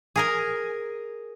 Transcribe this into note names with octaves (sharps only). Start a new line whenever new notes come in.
G#4 A#4 G#5